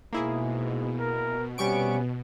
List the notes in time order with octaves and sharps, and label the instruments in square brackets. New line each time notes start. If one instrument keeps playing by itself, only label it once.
[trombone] G#2 [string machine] B2 [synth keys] A#3 E4 G#4
[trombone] A#4
[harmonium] C3 C#4 [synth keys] G3 C#6 D7 [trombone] B3